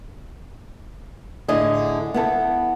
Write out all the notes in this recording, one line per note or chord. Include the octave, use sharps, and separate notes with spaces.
A2 D3 E4 G#4 D#5
B3 E4 A4